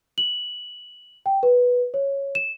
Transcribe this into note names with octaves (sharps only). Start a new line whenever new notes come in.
F#7
G5
B4
C#5
E7